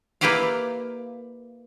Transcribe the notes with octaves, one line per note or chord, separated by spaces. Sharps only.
A#3 E4 G4 B4 D5 F5